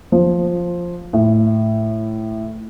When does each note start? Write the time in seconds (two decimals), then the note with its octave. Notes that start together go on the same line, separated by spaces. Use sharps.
0.12 F3
1.13 A2